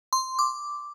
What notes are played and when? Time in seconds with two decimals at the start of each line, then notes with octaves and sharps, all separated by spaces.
0.13 C6
0.39 D6